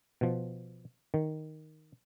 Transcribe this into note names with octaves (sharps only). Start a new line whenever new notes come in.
B2 F3
D#3